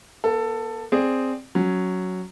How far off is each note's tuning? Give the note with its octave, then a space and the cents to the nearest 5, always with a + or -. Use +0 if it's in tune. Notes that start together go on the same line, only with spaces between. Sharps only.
B3 -45 A4 +15
C4 +0 G#4 +0 D5 +0
F#3 +0 C#4 +0